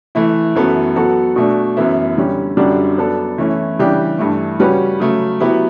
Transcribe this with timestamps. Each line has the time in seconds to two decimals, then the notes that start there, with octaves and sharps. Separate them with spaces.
0.15 E3 A3 E4
0.56 F#2 E3 B3 F#4 A4
0.96 F#3 B3 F#4 A4
1.36 B2 A3 D4
1.77 F#2 E3 B3 E4
2.17 D3 G3 C#4
2.57 F#2 D3 G3 D4 F#4
2.98 F#3 B3 D4 A4
3.38 E3 A3 C#4 E4
3.79 C#3 E3 G3 D4 G4
4.18 G2 E3 A3
4.59 C#3 G3 C#4 F#4 B4
5.00 C#3 F#3 A3
5.40 F#3 B3 E4 G4